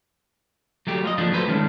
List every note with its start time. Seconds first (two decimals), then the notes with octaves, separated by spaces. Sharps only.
0.87 F#3 A3 G4
1.04 F4 A#4 D#5
1.18 F3 A3 A#3 D4
1.32 F#3 A3 B4 C5
1.48 D#3 G#3 A3 C#4 D4